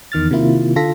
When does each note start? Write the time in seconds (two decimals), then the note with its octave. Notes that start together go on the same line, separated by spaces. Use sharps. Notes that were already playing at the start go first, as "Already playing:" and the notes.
0.12 E2 D#3 F6 A6
0.31 C3 D#3 A#3 E4 F4
0.76 D3 F4 A4 A#6 B6